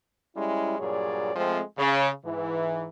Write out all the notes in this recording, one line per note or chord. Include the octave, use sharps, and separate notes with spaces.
G3 G#3 C#4 E4
G2 A#2 F#3 G#4 C#5 D5
F3 G#3 A3 C4
C#3
G#2 E3